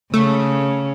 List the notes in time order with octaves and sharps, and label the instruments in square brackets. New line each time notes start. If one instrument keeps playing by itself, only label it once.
[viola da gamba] C#3 [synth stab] A3